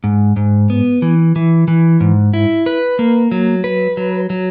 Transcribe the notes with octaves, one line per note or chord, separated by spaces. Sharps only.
G#2
G#2
B3
E3
E3
E3
G#2
E4
B4
A#3
F#3
B4
F#3
F#3